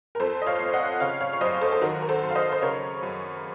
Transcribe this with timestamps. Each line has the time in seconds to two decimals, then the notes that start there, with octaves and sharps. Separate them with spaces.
0.15 A#4
0.20 F2 A4 C5
0.42 D#5
0.47 C#5 F5
0.60 F2
0.73 D#5 F#5
1.00 C#3 C#5 F5
1.21 C#5 F5
1.33 C#5
1.41 F#2 C5 D#5
1.61 A4 C5
1.72 A4
1.81 D#3 F#4 A#4
2.02 A#4
2.09 A4 C5
2.22 F#2
2.30 F5
2.35 C5 D#5
2.52 C5
2.62 C#3 A#4 C#5
3.03 F#2